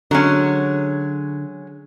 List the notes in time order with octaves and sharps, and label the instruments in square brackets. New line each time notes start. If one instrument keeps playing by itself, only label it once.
[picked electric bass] D3 [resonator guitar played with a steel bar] F#3 G#3 C#4